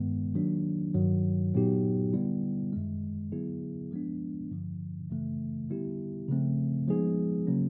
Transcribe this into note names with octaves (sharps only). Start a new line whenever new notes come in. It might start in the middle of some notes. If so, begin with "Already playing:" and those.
Already playing: G2 D#3 G#3 B3
D#3 F#3 A#3 D4
G2 D#3 F#3
A#2 F#3 B3 D#4 G4
D3 G3 B3 E4
F#2 D#3 G#3
D3 F#3 B3 E4 G#4
F3 G#3 B3 D4
G2 D3 F3
F#2 C#3 E3 A3
D3 G3 B3 E4 G4
C#3 F3 A3 C4
F3 G#3 B3 D#4 G#4
C#3 F#3 A#3 C#4